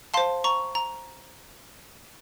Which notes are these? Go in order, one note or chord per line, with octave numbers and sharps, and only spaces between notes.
C5 F5 A5 C6
A#5 C#6
A#5